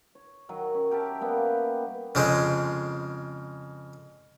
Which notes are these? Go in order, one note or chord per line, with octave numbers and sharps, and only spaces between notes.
C#5
D#3 F#3
C#4
G4 A#4 E5 A5
G3 A#3 B3
F2 C#3 G#3 C4